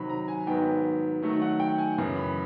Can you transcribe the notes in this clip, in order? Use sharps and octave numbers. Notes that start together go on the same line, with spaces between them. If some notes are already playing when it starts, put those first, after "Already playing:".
Already playing: C3 D#3 F#3 B5
A#5
G#5
G#2 D#3 F#3 B3 G5
D#3 F#3 A3
F#5
G5
G#5
F#2 C#3 E3
B5